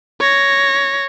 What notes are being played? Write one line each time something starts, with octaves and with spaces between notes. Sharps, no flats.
C#5 A#6